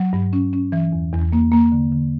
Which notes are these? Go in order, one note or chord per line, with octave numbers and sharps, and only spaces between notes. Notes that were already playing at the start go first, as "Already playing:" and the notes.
Already playing: F#3
G2
C#4
C#4
E3
E2
E2
A#3
A#3
D3
D3